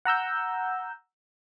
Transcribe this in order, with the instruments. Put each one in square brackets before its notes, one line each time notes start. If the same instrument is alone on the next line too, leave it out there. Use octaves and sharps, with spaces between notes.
[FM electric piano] F#5 A#5 E6 G6